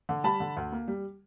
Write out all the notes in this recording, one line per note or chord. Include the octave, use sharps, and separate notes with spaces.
D3
G3 A5 B5
D3
D2
A#3
G3